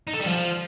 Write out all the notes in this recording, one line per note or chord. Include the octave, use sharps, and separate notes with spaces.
D#4
A4
G3
F3